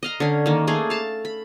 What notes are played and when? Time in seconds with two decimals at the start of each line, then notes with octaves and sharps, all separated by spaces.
0.03 D#5 F5 A#5
0.20 D3 C#4
0.46 D#3 A#3
0.67 A3 A#3 G#4
0.90 F5 A5
1.25 B5